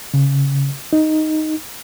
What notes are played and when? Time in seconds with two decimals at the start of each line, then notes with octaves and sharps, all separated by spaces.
0.14 C#3
0.93 D#4